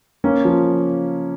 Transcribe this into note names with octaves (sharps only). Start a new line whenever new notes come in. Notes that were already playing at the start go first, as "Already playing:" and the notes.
A#3 C#4
F3